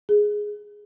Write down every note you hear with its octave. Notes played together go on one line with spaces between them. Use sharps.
G#4